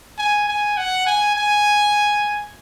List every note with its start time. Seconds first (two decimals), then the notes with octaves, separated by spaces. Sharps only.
0.18 G#5
0.48 G#5
0.78 F#5
1.07 G#5
1.36 G#5